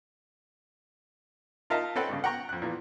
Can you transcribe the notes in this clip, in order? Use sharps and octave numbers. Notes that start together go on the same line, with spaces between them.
D#4 F4 A#4 D#5 E5 A5
C4 C#4 A4 B4 F#5 G5
G2 C#3
F#5 G5 A#5 C#6
F2 F#6
A#2 E3 F3